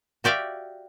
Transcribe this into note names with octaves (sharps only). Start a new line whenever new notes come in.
F#4 G4 D5 E5 F5